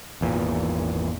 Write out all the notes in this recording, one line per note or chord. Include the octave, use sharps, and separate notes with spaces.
G#1 E2 A#2